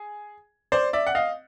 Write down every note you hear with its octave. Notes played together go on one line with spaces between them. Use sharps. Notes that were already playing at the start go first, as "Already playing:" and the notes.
Already playing: G#4
C5 D5
D5 E5
F#5
D#5 F5